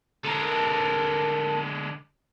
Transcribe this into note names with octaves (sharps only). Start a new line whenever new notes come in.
D3 G#3 A4 A#4